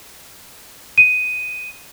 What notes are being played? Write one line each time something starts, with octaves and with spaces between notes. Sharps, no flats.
D#7